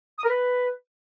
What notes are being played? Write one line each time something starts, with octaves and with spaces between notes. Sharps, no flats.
D#6
A#4
B4